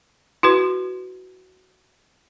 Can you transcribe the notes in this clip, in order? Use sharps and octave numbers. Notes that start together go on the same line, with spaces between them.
E4 F#4 B4